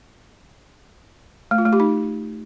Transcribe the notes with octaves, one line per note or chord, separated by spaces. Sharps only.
A3
F4
A3
G4
D#4